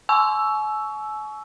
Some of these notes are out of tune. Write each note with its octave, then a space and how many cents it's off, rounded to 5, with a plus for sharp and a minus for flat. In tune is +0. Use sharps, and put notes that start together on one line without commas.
G#5 +45 C#6 +20 E6 +0